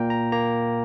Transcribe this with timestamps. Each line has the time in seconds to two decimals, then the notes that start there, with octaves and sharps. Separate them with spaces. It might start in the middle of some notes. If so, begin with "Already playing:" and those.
Already playing: A#2 A#3 G5 A#5
0.10 A#5
0.32 A#3 A#5